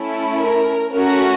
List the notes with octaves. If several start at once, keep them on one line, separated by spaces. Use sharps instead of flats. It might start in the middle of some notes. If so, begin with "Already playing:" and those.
Already playing: A3 C#4 E4
A#4
A3 C#4 F#4 A#4